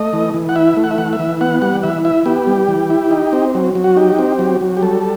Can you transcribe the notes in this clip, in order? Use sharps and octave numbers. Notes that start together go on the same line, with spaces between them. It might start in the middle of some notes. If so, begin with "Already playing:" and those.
Already playing: A3 D#5
E3
E3
F#5
E4 E5
A3
F#5
E5
E3 F#5
E5
E3
B3 F#5
G3 F#5
E3 E5
E4 E5
B3 G4
G3
E3
E4
D#4
C4
F#3
F#3
F#4
D#4 G4
C4
F#3
F#3
G4
G3 A4